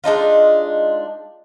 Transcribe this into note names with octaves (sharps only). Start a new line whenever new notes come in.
G#3 D4 D#4 F4